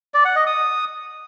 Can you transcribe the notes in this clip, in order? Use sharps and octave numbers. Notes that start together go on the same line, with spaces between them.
D5
F#5
D#5
D#6